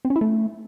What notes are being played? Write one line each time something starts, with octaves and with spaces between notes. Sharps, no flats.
C4
C#4
E4
A3